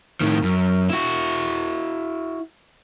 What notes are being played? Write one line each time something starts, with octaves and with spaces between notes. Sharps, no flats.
A2 D#3
F#2
E4 F#4